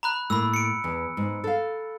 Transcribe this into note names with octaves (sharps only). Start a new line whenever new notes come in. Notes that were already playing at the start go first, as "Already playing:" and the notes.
A#5 B5 F#6
A2 A#3 B5 E6
C#7 D7
E2
G#2
A4 F5